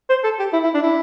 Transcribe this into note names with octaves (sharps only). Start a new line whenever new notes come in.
C5
A4
G4
E4
E4
D4
E4